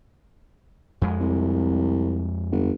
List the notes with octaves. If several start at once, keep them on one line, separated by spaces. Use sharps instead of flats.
F2 G#3
C2
G1